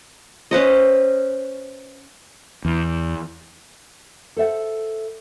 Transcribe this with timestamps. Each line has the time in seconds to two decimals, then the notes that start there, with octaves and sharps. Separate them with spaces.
0.51 C#4 B4 C5 D#5
2.65 E2
4.37 A4 C5 E5 F#5